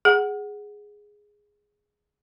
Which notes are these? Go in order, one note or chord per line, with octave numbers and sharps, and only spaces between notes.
G#4 F#5